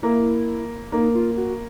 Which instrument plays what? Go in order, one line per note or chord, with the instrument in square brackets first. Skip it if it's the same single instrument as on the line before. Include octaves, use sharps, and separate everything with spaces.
[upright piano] A#3 [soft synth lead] E4
[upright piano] A#3 [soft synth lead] D#4
[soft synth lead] F4
F#4